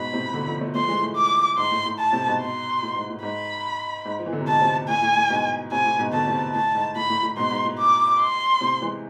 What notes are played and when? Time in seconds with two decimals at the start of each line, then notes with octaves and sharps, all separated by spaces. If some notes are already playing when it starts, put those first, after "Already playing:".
Already playing: G#2 B2 B5
0.13 A2 C3
0.34 B2 D3
0.47 D3 F3
0.61 F3 A3
0.75 F3 A3 C6
0.88 E3 G#3
1.02 A2
1.16 D6
1.57 G#2 C6
1.71 A2
1.86 A2
1.99 A5
2.13 A2 C3
2.26 G#2 B2
2.41 C6
2.82 A2
2.96 G#2
3.10 A2
3.23 G#2 B5
4.05 G#2
4.19 F3
4.26 E3
4.33 D3
4.41 C3
4.47 G#2 B2 A5
4.61 A2 C3
4.88 A2 G#5
5.02 A2
5.16 A2
5.30 G#2 B2
5.71 A2 C3 G#5
5.85 A2
5.99 G#2 B2
6.13 B2 D3 A5
6.27 A2 C3
6.55 A2 A5
6.75 G#2
6.96 A2 B5
7.10 A2
7.23 A2
7.37 G#2 B2 C6
7.51 G#2
7.65 A2
7.78 D6
8.20 C6
8.61 A2 C3
8.82 E3 G#3